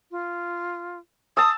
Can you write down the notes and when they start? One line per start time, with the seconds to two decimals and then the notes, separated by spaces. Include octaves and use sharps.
0.11 F4
1.37 A5 D#6 E6